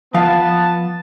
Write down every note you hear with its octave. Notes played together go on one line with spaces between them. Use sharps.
F3 B3 F5 A5